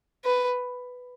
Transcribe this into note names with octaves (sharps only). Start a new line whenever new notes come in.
B4